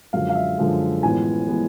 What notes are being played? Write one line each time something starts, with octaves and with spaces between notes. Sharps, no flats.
F#2 D3 F3 G#3 F5
F5
E5
F#2 D3 F3 G#3
A1 A2 F3 G#3 B3 G#5
A2 F3 G#3 B3